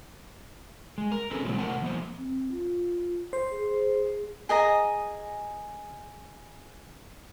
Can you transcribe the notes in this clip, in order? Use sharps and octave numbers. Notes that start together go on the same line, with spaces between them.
G#3
A#4
C4 C#4 G#4 A4 B4
B2 E3 F#3 G#3 B3 C4
C3 A3 A#4 C5 F#5 A5
F3 A#3 B3 C5
C4
F4
C5
G#4
G#4 D#5 G#5 A#5